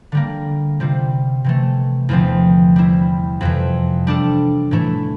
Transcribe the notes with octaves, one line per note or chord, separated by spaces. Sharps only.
D3 G3 A#3
C3 G3 C4 F4
C3 E3 A3
E2 D3 F3 C4 E4
G3 C4 E4
F2 C3 E3
G3 D4 A4
A2 E3 A3 E4